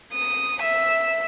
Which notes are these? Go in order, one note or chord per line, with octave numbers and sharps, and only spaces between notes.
D#6
E5